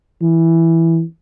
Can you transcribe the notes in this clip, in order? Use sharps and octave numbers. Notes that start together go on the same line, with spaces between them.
E3